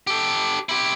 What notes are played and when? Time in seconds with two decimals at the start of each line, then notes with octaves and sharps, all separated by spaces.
0.07 G4 A4
0.69 E4 G4